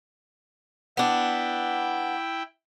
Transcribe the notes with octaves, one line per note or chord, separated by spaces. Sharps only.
B3 D4 E4 G5